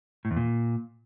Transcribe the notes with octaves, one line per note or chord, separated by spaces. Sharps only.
A2
E2
A#2